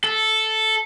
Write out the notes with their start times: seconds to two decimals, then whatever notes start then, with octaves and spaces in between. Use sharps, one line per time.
0.04 A4